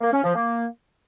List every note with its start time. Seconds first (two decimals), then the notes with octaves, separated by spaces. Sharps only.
0.01 A#3
0.12 C#4
0.24 F3
0.35 A#3